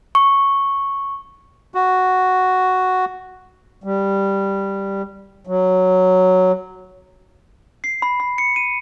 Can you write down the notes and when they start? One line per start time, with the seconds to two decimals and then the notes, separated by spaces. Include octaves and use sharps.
0.15 C#6
1.74 F#4
3.84 G3
5.47 F#3
7.84 C7
8.02 B5
8.20 B5
8.38 C#7
8.56 D#7